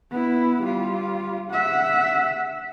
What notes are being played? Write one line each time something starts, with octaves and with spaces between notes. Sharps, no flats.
B3 E4
G3 F4
E5 F#5